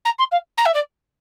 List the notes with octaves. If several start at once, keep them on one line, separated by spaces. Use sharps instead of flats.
A#5
C6
F5
A#5
E5
D5